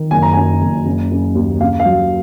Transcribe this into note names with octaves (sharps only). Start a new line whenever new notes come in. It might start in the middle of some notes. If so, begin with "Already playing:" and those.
Already playing: D#3
F#1 G#5
A#5
F#2 G#5
F#1
C#3
C#3
D#2
C#3 F5
F5
F#3